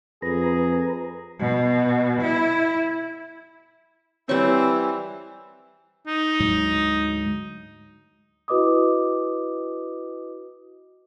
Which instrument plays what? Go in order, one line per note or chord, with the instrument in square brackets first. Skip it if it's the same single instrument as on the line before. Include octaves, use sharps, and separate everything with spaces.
[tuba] F2 [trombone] G#4 [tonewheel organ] B4 A#5
[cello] B2
E4
[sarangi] E3 [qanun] G3 C#6 [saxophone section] C4 [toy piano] E4 B4 C#5
[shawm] D#4
[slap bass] D2 G#2 F#3
[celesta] E4 F#4 B4 D#5 D6 D#6